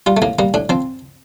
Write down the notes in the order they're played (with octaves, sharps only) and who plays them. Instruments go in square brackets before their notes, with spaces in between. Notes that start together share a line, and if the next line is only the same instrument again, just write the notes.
[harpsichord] G3 F4
A3
A2 A#3
G3 A#3
A2 D4
F3 C4